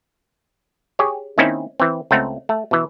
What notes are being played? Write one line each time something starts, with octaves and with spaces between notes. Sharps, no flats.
G4 G#4 C#5
D#3 A#3 C4 C#4 D#4 E4
E3 C4
C#2 A3 C4 F#5 A#5
A3
B2 E3